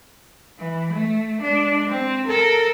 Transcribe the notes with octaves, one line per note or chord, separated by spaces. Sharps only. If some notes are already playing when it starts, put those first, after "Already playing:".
E3
A3
G#3 D4
C4
A4 A#4